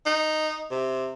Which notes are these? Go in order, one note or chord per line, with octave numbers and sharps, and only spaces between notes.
D#4
C3